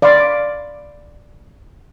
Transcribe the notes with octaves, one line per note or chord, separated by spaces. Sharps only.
D5 F5 B5 C6 D6